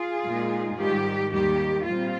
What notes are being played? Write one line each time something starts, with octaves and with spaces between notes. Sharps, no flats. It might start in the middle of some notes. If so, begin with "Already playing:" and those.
Already playing: F4 G#4
A#2 G#3 D#4
G#2 D#3 G3 G4
D#2 D#3 G3 G4
A#2 G3 C4 F4